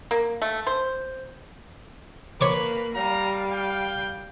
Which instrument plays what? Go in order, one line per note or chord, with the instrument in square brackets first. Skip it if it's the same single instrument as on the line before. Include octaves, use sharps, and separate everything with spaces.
[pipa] A#3
A3
C5
[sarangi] A#3 [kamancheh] B4 [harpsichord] C#5 C6 D6
[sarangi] G3 [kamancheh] F5 [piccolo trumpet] A#5
[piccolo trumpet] G5